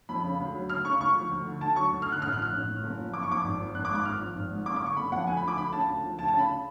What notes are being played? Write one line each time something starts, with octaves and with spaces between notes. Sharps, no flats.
F2 B5
C#3
D2
F#3
D2 F6
C#3 C#6
D2 C#6
F3
D2
D3
D2 A5
F#3 C#6
D2
F6
D3
F#6
A1 F6
F#6
F3
F6
A1
A2
F#1
F3
F#1 D6
C#6
F2 D6
G#1
F3
G#1 F#6
D6
G#2
D6
G#1 F6
F3
G#1
G#2
F#1 D6
D6
D3 C#6
F#1 B5
F2 F#5
D2 G#5
B5
F3
D6
D2 B5
C#3 A5
D2
F3
D2 A5
A5
C#3
B5